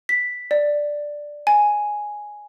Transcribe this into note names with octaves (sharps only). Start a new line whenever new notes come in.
B6
D5
G#5